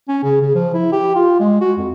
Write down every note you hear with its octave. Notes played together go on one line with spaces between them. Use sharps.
C#4
C#3
C#3
F3
E4
G4
F4
G#3
F#4
F2